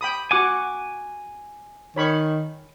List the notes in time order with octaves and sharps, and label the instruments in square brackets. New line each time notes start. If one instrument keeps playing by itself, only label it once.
[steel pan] G5 B5 D#6
[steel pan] F#4 F#5 [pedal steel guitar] G#5 D6
[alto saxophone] D#3 [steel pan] C#5 B5 C#6